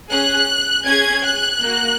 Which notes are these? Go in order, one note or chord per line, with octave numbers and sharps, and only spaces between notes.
C#4 G#4 F#6
C#4 G#4 G#6
F#6
A#3 F#4